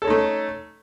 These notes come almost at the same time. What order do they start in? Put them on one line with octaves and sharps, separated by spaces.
A4 C#4 D#4 A3